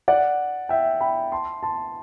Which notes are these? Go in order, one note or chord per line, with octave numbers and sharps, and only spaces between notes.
D5 F#5
E5 G5
G5 B5
A5 C6
A5 C6